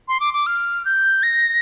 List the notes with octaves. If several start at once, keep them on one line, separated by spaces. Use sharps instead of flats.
C6
D6
D6
F6
G6
A#6